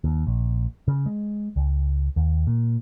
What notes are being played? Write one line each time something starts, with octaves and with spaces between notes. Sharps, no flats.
D#2
A#1
C#3
G#3
C#2
D#2
A#2